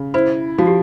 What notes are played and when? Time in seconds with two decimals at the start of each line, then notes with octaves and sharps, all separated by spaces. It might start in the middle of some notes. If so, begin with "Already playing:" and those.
Already playing: C#3
0.14 E4 C5
0.58 F3 F#4
0.67 G4